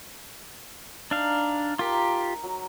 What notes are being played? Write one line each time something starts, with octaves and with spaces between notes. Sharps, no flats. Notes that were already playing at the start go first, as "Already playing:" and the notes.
D4 D#4 E5 F5
F4 G4 A#4 A5
F#3 F#4